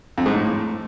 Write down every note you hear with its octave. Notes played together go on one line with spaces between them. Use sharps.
F2
G#2
A2